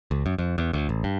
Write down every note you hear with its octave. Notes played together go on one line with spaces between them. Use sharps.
C#2
F#2
F2
E2
D2
A1
G2